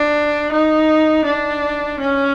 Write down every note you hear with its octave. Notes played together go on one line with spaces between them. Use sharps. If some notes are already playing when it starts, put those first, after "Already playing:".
Already playing: D4
D#4
D4
C#4